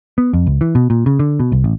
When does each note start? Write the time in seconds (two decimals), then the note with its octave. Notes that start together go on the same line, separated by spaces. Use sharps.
0.18 B3
0.33 F2
0.47 C#2
0.61 E3
0.75 B2
0.90 A#2
1.06 C#3
1.19 D3
1.40 B2
1.52 C2
1.64 A1